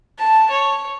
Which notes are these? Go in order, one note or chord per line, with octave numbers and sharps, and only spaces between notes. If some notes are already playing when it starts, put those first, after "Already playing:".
A5
C#5